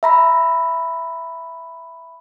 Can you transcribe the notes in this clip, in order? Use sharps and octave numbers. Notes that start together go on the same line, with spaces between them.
E5 A#5 B5